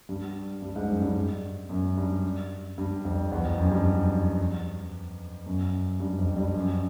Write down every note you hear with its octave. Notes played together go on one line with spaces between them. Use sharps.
G2
G2
G#2
F#2
G2
F#2
G2
G2
F2
E2
F2
F#2
G2
F#2
G2
F2
G2
F#2